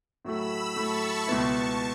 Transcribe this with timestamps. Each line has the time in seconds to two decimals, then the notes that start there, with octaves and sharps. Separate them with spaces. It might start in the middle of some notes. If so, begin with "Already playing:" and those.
0.25 A2 F#3 A3 B5 E6
0.76 A2 F#3 A3 A5 C#6
1.27 C#2 B2 B3 E4 A5 C#6